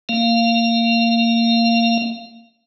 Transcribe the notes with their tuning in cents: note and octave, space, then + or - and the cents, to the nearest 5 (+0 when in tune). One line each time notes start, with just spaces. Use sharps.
A#3 -20 F5 -10